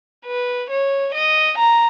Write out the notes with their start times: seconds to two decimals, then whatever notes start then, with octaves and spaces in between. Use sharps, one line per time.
0.26 B4
0.70 C#5
1.14 D#5
1.58 A#5